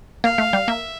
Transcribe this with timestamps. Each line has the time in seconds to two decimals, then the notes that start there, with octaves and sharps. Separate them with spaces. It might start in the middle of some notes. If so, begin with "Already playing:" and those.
0.24 A#3 F5
0.38 A3
0.53 G3
0.68 A#3 E5